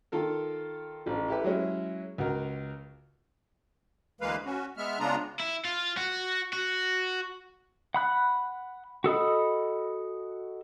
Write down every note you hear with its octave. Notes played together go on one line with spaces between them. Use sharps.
D#3 F4 A4 A#4
A1 F3
E4 G4 A4 B4
F#3 G#3 C#4 E4
C#2 F#4 A#4
D2 E3 G#3 A#3 B4 F5
C#4 F#4
G#3 B3 E5 F6
C#3 G#3 B3 D4 F4 A#5
E4
F4
F#4
F#4
F#5 B5 F#6
F#4 A4 D#5 B5